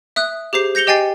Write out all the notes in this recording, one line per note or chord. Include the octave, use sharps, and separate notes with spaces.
E5 D#6 F#6
G4 G#4 C5 C7
G6 A#6 C#7 F7 G7
G4 D#5 G5 G#5 A6 C7